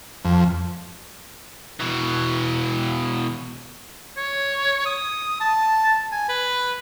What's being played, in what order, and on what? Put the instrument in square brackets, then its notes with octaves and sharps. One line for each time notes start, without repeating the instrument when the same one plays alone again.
[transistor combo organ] F2
[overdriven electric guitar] B2 E3
[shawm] C#5
D#6
A5
G#5
B4